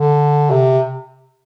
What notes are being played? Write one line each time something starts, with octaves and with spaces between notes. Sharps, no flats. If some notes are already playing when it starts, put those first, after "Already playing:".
Already playing: D3
C3